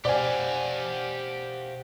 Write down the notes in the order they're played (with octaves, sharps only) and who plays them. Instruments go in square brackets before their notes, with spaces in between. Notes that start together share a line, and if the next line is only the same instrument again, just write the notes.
[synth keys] B2 C5 F#5 [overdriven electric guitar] G4 F5 [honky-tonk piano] D5 G#5